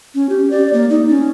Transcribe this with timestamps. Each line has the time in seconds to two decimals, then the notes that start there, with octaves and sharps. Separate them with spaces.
0.15 C#4
0.29 G4
0.51 D5
0.74 A#3
0.90 D#4
1.09 C#4